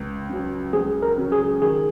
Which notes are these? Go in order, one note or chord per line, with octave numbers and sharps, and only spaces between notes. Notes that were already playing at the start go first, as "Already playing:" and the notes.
Already playing: C#2
C#3 F#3 C#4
C#2 G#4
A#4
C#3 F#3 C#4
G#4
D#3 G#4